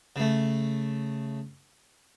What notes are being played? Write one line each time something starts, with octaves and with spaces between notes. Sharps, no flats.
C#3 A3